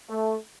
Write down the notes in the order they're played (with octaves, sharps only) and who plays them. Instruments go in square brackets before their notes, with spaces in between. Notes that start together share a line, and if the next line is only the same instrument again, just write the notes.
[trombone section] A3